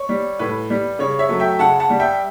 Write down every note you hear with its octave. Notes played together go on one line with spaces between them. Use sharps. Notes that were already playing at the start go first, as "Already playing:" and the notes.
Already playing: C#5
G3
A2 B4
G3
C#3 C#5
C#5 E5
F#3 A3
E5 G5
C#3 F#5 A5
F#5 A5
G3
E5 G5